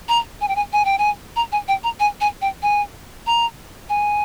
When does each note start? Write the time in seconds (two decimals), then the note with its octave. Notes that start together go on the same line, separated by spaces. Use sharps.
0.09 A#5
0.41 G#5
0.48 G5
0.56 G#5
0.73 G#5
0.85 G5
0.99 G#5
1.36 A#5
1.52 G#5
1.68 G5
1.84 A#5
2.00 G#5
2.21 G#5
2.42 G5
2.62 G#5
3.27 A#5
3.89 G#5